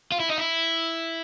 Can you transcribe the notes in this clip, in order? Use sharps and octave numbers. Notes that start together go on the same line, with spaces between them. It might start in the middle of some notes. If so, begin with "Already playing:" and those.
F4
E4
D#4
E4